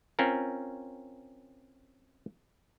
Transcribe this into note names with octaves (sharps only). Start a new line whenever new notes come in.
C4 C#4 F4 A#4